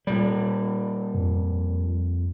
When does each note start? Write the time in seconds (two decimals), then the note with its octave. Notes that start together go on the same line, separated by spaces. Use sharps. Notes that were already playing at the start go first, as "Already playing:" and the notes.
0.07 A#2 G3
1.15 F2